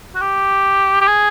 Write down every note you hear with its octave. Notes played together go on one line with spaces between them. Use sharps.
F#4
G4
G4
G#4